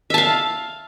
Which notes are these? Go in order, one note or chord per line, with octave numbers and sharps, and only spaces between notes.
E5 F5 A5